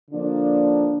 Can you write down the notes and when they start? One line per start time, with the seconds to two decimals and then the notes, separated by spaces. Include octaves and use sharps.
0.11 D3 F3 A#3 D4